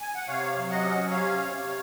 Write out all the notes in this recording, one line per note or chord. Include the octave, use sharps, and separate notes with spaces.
G#5
F#5
C3 C#5 F5
F#3
D#5 F#5
C#4
C3 C#5 F5
C3